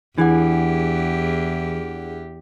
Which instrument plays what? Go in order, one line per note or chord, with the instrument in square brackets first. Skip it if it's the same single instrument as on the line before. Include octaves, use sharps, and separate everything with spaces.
[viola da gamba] E2 G4 [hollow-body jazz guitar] E3 [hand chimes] D4 G#4 F#5